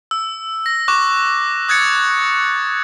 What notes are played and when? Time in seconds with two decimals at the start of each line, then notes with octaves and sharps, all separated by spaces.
0.11 E6
0.66 A#6
0.88 C#6 D6 F#6
1.69 D#6 F#6 G#6 A6 C#7